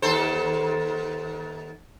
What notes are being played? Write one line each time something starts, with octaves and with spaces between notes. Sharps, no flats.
D#2 A4 C5